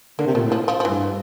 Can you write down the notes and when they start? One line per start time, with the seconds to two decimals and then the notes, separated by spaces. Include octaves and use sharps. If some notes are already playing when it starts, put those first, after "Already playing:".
0.19 D3 A#3
0.27 C3
0.35 A#2 A3
0.44 A2
0.52 F3
0.68 F3
0.80 F3
0.85 G2 E3